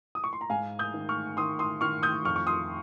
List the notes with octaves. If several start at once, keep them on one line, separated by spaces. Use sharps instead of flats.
D#6
C#6
C6
A#5
G#2 F5 G#5
D#6 G6
D#3
C#6 F6
D#3 C6 D#6
C6 D#6
D#3 C#6 F6
D#6 G6
F2 C#6 F6
C#6
C6 D#6